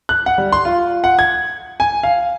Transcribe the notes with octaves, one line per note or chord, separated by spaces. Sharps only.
F#6
F#5
G3
C6
F4
F#5
G#6
G#5
F5